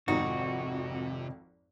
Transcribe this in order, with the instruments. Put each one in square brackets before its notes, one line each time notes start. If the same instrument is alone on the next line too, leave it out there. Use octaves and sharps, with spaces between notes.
[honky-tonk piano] G#1 F2 [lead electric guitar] C3 [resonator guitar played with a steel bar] D#4 [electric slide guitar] F#4